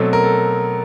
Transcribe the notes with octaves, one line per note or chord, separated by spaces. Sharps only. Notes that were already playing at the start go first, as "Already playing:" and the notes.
Already playing: B2 F#3 A3 C4 A4
A#4
A4